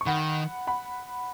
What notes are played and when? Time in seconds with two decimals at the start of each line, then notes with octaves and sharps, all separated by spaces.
0.01 C#6
0.06 D#3 F#5 B5
0.67 F#5 B5